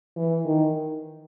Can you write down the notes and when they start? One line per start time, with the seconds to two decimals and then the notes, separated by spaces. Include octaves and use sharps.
0.16 E3
0.45 D#3